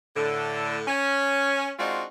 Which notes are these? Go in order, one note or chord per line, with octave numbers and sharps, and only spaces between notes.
A2 D3
C#4
G#3 C4 D4 D#4 F4 F#4